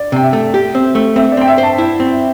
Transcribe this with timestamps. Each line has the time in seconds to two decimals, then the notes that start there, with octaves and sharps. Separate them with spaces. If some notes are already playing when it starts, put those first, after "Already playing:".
Already playing: D5
0.12 C3 G5
0.23 E5
0.33 A3
0.54 G4
0.75 C4
0.95 A3
1.16 C4 E5
1.32 D5
1.37 C4 G5
1.48 E5
1.58 C5
1.63 A5
1.78 E4
2.00 C4